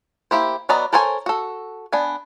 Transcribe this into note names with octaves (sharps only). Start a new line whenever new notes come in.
A#3 E4 G4 C5
F#3 B3 D5 D#5 A#5
A4 A#4 C5 C#5 G#5
F#4 A4
B3 D4 G#5